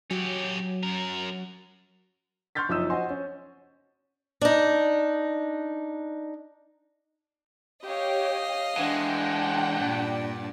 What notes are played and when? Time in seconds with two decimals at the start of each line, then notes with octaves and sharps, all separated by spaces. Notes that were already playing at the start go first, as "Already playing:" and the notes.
0.11 F#3 C#4 G4
0.83 F#2 A#4
2.55 C6 C#6 F6 G6 A6 B6
2.69 F#1 F3 D#4 D#6 E6 E7
2.90 F#4 C5 D#5 G#5 C6
3.10 C#4
4.41 D4 D#4
7.85 G4 C#5 D#5 F5
8.77 E3 G#3 D4 F#5 G5
9.78 G2 A#2 D5